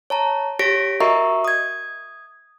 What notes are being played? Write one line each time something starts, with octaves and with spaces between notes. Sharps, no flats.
C#5 A5 A#5
G4 C#5 A#6 B6 D7
F#4 A#4 D#5 E5 A#5 C#6
D#6 G#6